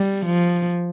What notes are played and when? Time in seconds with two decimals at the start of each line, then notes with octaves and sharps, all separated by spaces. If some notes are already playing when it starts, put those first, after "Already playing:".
Already playing: G3
0.26 F3